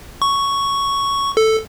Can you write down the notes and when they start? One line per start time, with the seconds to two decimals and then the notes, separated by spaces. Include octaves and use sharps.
0.22 C#6
1.37 A4